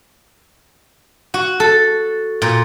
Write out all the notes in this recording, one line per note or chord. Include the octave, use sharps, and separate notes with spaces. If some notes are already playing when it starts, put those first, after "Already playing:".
F#4
A4
A#2